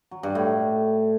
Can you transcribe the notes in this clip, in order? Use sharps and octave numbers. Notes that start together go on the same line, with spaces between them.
F#3
G2
A2